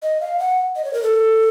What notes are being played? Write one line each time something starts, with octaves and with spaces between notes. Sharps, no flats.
D#5
F5
F#5
D#5
C#5
A#4
A4